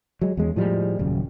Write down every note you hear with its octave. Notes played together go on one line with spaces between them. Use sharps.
F#3 G#3
E2 G#3 C#4
A2 F3 G3 G#3
D#1 F#2 C#3